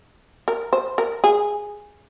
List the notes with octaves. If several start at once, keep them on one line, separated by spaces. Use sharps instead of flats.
A#4
C5
A#4
G#4